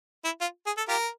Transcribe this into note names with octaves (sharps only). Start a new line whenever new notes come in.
E4
F4
G#4
A4
F4 G4 A#4